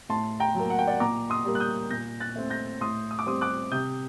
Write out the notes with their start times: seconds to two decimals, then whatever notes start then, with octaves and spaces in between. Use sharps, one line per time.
0.09 A2 A5 C6
0.40 G5 A#5
0.55 F#3 A#3
0.70 F#5
0.79 G5
0.87 D5 F#5
1.00 A#2 A#5 D6
1.30 C6 D#6
1.45 G3 A#3
1.55 F#6
1.60 D#6 G6
1.91 A#2 G6 A#6
2.20 F#6 A6
2.36 A3 C4
2.50 G6 A#6
2.81 A2 C6 D#6
3.11 D#6
3.19 D6
3.26 G3 C4 C6 D#6
3.41 D6 F#6
3.72 C3 D#6 G6